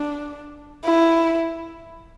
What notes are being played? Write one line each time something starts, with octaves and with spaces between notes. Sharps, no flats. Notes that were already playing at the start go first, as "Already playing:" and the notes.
Already playing: D4
E4